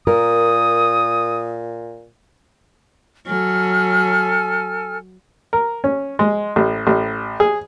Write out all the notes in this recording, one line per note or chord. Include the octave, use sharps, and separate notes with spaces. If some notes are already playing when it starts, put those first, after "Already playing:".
A#2 A#4 D#6
F#3 A4 G#5 F6
A#4
C#4
G#3
A1
A1
G#4